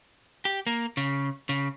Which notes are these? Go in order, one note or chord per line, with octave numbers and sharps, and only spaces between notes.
G4
A#3
C#3
C#3